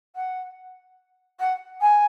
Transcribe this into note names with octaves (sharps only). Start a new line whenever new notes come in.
F#5
F#5
G#5